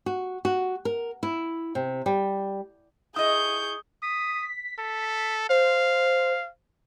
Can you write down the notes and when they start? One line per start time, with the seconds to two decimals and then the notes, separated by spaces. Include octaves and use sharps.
0.06 F#4
0.45 F#4
0.85 A#4
1.23 E4
1.75 C3
2.06 G3
3.16 E4 G#4 D#5 C#6 D#6 G6
4.02 D#6 B6
4.78 A4
5.49 C5 F5